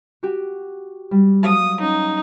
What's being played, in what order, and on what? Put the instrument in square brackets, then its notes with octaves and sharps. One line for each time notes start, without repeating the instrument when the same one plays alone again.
[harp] F#4 G4
G3
[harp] F#3 F5 [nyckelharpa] D#6
[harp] C#4 [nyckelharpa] D#4